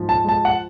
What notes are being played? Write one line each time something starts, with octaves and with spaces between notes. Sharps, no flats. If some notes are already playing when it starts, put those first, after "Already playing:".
Already playing: G#2 F3
A5
G#3 A5
F#5